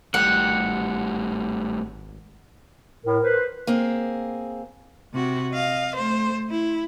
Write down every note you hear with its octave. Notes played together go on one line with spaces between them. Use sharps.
G#1 A2 G3 G4 F#5
A2 A#4
B4 C5
A#3 C4 G#4
C3 F#4
D#5 F5
A3 C5
E4